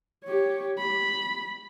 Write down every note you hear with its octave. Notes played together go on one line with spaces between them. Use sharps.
G4 C#5
B5